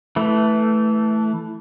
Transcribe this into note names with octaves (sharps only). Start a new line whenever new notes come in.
E3 A3